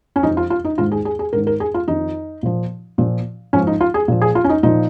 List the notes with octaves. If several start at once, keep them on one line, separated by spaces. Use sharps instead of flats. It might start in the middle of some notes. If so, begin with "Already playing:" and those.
C#4
F2 F3 D#4
F4
F4
D#4
G#2 D#3 F4
G#4
G#4
G#4
G#2 D#3 A#4
A#4
G#4
F4
F2 D#3 D#4
A#2 F3
A#2 F3
G#2 F3 C#4
D#4
F4
G#4
A#2 F3
G#4
F4
C#4
D#4
A#2 F3 D#4